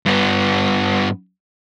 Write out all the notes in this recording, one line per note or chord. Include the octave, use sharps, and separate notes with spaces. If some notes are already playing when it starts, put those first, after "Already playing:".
G2 B3